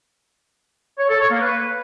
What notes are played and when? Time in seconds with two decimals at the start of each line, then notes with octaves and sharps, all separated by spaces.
0.98 C#5
1.09 A4
1.20 C#5
1.30 A#3
1.41 B4